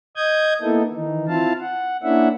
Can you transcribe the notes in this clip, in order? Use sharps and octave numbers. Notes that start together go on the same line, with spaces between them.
D#5 D#6 G6 G#6
A#3 B3 D#4 E4 A4
D#3 E3 D#4
C4 E4 F4 F5 A5
F#5
A#3 C#4 D4 E4 E5 F#5